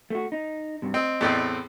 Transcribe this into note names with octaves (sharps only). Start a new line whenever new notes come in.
A3 F#4
D#4
G2 C3
C4 D#5
E2 A2 C4